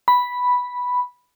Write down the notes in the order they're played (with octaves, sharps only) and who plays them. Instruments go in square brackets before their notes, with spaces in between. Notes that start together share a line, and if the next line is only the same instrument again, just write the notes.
[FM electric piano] B5